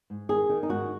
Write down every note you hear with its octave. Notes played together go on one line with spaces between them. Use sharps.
G#2
D#3 G#4
D#3
D#4
G#2 F#4